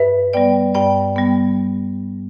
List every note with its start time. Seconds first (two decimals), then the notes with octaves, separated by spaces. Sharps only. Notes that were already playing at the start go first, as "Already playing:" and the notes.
Already playing: G2 B4 E5
0.33 G3 B3 D5 G5
0.74 G2 D5 G5
1.16 G3 B3